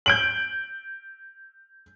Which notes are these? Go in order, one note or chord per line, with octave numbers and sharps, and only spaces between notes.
G6 D7 F#7